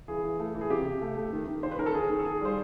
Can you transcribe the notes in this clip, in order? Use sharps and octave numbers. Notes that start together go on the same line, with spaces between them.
E3 G#4
E3
A3
E3
G#4
C3 G4
C3
A3
A3
D#3
D#3
D#3 C5
B4
D#3 A#4
A4
D#3 G#4
D#3
A4
D#3 G#4
G3 C5